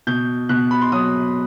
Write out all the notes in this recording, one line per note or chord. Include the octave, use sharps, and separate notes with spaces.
B2 G6
B2 F#6
B5
C6
F#3 D#6